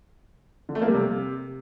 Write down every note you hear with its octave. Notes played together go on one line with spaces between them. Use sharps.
D3
A3
A#3
G3
C3